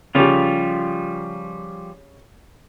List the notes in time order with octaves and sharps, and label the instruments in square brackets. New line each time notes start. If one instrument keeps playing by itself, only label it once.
[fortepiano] C#3 G4 [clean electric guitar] F3 G3 F4